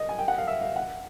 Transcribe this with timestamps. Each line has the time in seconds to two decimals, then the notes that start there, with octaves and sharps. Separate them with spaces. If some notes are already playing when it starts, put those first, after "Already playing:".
Already playing: D#5
0.09 G#5
0.19 G5
0.28 F#5
0.38 F5
0.47 E5
0.61 F5
0.76 F#5